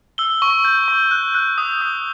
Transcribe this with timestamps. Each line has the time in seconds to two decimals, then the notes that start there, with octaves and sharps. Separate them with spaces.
0.18 E6 G7
0.42 C#6
0.65 G6
0.88 C#6
1.11 F#6
1.35 F#6
1.58 D#6
1.81 D#6